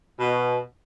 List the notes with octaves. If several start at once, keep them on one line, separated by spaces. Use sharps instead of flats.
B2